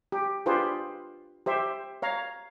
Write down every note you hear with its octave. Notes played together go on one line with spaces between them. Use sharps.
G4
D4 F4 G4 G#4 B4 C5
G4 C5 E5
C#5 F5 A#5